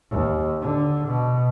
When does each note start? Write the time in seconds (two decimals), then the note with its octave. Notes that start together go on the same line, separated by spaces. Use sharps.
0.11 D#2
0.61 D3
1.07 B2